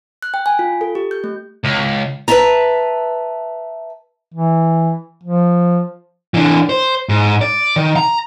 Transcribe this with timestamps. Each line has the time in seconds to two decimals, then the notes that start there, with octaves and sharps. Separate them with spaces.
0.22 F#6
0.34 G5
0.46 G#5
0.59 F4
0.81 A4
0.95 G4
1.11 G6
1.24 A3
1.65 C#2
2.28 B4 C#5 E5 A5 A#5
4.34 E3
5.24 F3
6.34 E3 D4
6.69 C5
7.09 G#2
7.41 D5
7.76 D#3
7.96 A#5